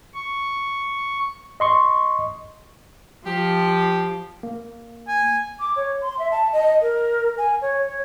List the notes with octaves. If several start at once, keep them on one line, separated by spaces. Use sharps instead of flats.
C#6
D#5 C6 C#6
F3 G4
A#3
G#5
D6
C#5
C6
E5
A5
D#5
A#4
G#5
C#5
C#5